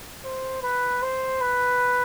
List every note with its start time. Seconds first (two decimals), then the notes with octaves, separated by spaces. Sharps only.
0.25 C5
0.63 B4
1.02 C5
1.41 B4